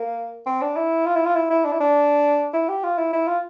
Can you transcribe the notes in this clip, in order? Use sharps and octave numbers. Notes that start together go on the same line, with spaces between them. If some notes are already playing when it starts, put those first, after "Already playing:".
Already playing: A#3
C4
D4
E4
F4
E4
F4
E4
E4
D4
E4
D4
E4
G4
F4
E4
E4
F4